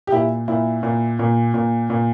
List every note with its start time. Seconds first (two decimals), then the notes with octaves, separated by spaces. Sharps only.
0.07 G4
0.12 A#2 E4
0.48 A#2 E4
0.83 A#2
1.19 A#2
1.54 A#2
1.90 A#2